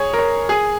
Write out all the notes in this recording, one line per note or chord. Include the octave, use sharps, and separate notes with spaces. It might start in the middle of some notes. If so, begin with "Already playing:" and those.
Already playing: G#4 C#5
A#4
C#5
G#4